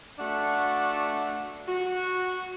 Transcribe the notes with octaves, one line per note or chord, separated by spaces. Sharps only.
A3 D4 F#4 E5 F#5
F#4